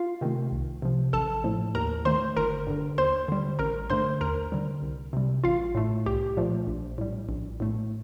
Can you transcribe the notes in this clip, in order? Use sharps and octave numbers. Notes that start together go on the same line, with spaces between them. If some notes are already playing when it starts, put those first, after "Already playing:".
Already playing: F4 F5
C3 D#3 A3
C2
C3 F3
A1 A4 A5
A2 F3 A3
D#2 A#4 A#5
D#3 A3 C5 C6
G1 A#4 A#5
G2 D3
D#2 C5 C6
D3 G3
A1 A#4 A#5
G2 D3 A3 C5 C6
D#2 A#4 A#5
D3 G3
C2
C3 G3
A1 F4 F5
A2 A3
C2 G4
A#2 F3 A3
A#1
A2 G3
A#1
A2 A3